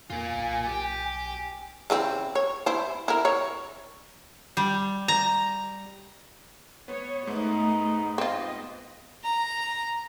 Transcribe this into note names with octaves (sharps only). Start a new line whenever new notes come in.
E2 A#3 F4 G#5
B1
G4
C#3 E3 C4
C#5
E4 C5
E4 A#4
C#5
G3
A#5
B3 C#5
G#2 A3 B3 D#4
C4 F4 D#5
A#5